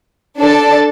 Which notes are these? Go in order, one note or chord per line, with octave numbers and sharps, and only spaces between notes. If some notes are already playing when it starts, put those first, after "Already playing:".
D4 A4 D5 A5